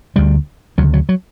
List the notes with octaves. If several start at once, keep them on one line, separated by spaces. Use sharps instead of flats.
D2 D3 G3
D2 C#3 F#3
F#3
F#3